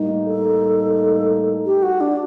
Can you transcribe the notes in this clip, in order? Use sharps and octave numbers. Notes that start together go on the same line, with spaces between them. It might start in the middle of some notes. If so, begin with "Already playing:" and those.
Already playing: A2 G3 A#3 D#4
A4
G4
F#4
D4